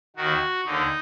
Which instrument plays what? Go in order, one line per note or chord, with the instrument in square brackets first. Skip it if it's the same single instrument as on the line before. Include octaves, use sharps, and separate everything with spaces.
[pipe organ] D#2 D#3 F#4
D#2 D3 D#4